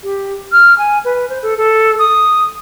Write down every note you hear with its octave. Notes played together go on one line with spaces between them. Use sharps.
G4
F6
G#5
B4
C5
A4
A4
D#6